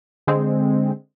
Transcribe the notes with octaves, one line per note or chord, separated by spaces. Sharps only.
D3 G#3 C4